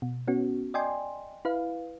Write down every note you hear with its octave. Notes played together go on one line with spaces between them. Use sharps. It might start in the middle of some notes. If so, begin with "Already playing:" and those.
B2
B3 C#4 F#4
D5 D#5 G5 G#5 C6
E4 B4 F5